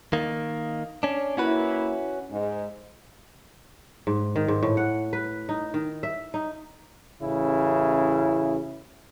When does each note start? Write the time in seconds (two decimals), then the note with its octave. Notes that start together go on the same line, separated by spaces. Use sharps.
0.13 D#3 A#3
1.03 C#4 D4
1.37 A#3 C#4 E4 F#4 B4
2.30 G#2
4.07 G#2
4.36 D#3
4.48 G#2
4.63 A2
4.77 F#5
5.13 B4
5.49 D#4
5.74 D#3
6.03 E5
6.34 D#4
7.22 A1 C#3 E4